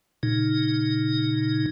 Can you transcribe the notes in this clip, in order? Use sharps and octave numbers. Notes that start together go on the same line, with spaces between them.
A#2 C#3 D#4